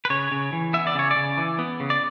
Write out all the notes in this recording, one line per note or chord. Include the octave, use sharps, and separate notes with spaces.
B4
C#3 C#5
C#3
E3
B3 E5
D5
C#3 C#5
D5
C#3
E3
B3
C#3
D5